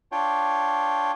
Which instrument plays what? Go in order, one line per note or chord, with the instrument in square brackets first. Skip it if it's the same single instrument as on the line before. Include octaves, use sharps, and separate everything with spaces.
[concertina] D4 F4 C#5 G5